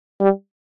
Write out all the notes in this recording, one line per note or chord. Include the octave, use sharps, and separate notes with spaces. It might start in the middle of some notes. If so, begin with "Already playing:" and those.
G3